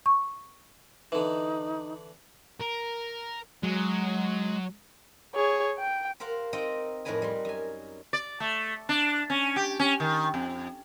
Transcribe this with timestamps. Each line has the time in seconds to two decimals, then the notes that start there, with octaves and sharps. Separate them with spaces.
0.06 C#6
1.12 D3 E3 D#4
2.61 A#4
3.63 F#3 G#3
5.35 G#4 C#5
5.79 G5
6.20 G4 A#4 C5 F5 F#5
6.53 C4 D#4 A#4 D#5 G5
7.05 F2 A2 D#4 A#4 B4 G#5
7.22 G3 C6
7.45 F#2 G#5
8.13 D5
8.40 A3
8.89 D4
9.30 C#4
9.56 G4
9.79 C#4
10.00 D#3
10.34 F2